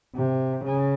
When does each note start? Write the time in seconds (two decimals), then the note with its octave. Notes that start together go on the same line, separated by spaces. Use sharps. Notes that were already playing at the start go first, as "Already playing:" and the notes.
0.16 C3
0.65 C#3